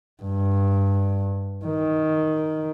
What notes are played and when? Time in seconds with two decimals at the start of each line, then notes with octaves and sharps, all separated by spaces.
0.23 G2
1.65 D#3